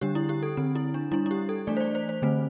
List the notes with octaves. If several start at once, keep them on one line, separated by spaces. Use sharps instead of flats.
D3 G3 D4 G4
E4
G4
A4
D3 C4
E4
D4
G3 D4 E4
E4
G4
A4
E3 A3 D4 D5
C5
D5
C5
C5
D3 A3 C4